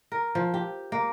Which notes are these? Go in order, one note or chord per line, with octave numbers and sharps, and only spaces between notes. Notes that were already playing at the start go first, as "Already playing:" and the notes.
A#4
F3
G4
A#3